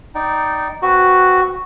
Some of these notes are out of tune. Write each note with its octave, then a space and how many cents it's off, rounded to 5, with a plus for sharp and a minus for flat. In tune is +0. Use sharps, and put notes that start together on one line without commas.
D#4 +0 D5 +5 G5 -25
C4 +0 F#4 +0 B4 +0